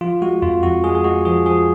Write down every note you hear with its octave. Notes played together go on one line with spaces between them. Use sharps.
F3 F4
G#3 F#4
F2 F4
F2 F#4
G#3 G#4
G#4
G#3 F#4
F3 G#4
F3 G#4